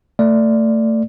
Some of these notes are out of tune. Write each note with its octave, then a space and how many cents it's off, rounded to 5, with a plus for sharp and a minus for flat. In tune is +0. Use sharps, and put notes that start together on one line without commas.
A3 +25 D5 +0